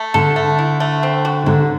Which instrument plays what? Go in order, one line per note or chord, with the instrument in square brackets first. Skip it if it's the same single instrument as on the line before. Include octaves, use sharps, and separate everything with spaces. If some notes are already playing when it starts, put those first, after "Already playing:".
Already playing: [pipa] A3
[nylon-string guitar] D3 [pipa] A4
[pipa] A3
E4
A3
C4
F#4
[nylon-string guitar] D3 [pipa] F#3